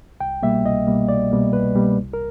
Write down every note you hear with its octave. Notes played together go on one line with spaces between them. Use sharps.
C2 G5
B2 G3 A#3 E5
C2 D#5
B2 G3 A#3
C2 D5
B2 G3 A#3
C2 B4
B2 G3 A#3
C2
A#4